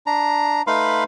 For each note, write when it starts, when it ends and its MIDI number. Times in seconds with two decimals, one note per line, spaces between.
0.07 0.62 62
0.07 0.62 82
0.67 1.04 57
0.67 1.04 63
0.67 1.04 71
0.67 1.04 77
0.67 1.04 83
0.67 1.04 84